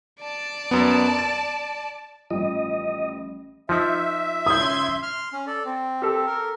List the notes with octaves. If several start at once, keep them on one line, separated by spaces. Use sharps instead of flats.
D5 A5
F#2 B3
A6
A1 F3 G3 D#5
F3 D#4 E5
C#3 C6 D#6 G6 G#6
C6 F6
C#4
A4 D5
C4
G4 A4
A#4